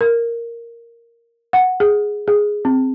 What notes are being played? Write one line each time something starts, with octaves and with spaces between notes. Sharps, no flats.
A#4
F#5
G#4
G#4
C4